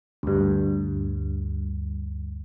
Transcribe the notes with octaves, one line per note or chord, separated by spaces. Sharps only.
D2 G2